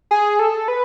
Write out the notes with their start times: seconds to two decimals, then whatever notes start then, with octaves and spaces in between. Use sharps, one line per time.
0.11 G#4
0.39 A4
0.68 B4